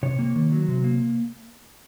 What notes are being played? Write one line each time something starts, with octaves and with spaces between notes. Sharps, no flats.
C3 C#5
A#3
D#3
F#3
C3
A#3